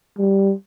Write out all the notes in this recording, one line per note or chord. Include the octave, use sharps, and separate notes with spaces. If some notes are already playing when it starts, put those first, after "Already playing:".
G3